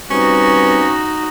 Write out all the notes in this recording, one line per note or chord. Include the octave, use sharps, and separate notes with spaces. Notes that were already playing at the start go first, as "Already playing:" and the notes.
G3 C4 C#4 D#4 F#4 B4